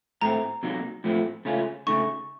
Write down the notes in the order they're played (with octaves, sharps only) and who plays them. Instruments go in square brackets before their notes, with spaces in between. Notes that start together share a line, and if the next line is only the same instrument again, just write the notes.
[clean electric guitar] A2 A3 C4 [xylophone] A#5
[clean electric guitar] C3 F#3 A#3 D#4
A2 F3 A3 C4
C#3 A3 C#4 F4
[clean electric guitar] C#3 A3 D#4 [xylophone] C#6